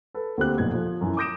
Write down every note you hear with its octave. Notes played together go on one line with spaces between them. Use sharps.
A4 B4
D2 A#3 C4 G4 F#6
B1 F2 A#2 A3 B3 G#6
F3
F#2 E3
D6 D#6 G6 A#6 D7 E7